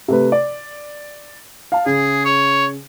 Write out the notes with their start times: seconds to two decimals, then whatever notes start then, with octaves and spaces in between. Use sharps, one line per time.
0.08 C3 A3 B4
0.32 D5
1.72 F5 A5
1.86 C#3 G#4
2.25 C#5